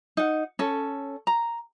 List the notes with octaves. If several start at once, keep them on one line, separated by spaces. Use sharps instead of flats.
D#4 F#5
C#4 A4
A#5